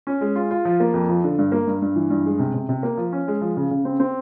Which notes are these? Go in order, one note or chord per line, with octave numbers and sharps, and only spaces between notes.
C#4
G#3
F4
F4
F3
A#3
F2
F3
D3
G2
A#3
G2
G2
E3
G2
G#3
C3
C3
C3
A#3
F3
C#4
G#3
F3
C#3
C#3
C4
C4